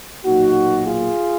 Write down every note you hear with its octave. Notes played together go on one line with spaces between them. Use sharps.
B1 A#2 F#3 A#3 D#4 F#4
F4 G#4